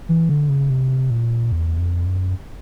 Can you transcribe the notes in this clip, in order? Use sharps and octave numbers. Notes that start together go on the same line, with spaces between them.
E3
D3
C#3
C3
A#2
E2
F2
F#2